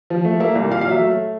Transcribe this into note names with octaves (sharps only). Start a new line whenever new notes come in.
F3
A3
A#3 E5
C2
A#2 F5
F5
F#3 E5
A3